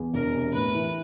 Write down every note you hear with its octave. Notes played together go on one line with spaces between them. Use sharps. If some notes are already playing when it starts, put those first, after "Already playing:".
Already playing: E2
E1 A#4
C3
A2 B4
E3